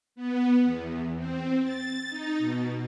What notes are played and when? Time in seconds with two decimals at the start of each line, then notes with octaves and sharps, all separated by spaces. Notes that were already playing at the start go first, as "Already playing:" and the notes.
0.16 B3
0.65 E2
1.16 C4
1.64 A6
2.10 D#4
2.39 B2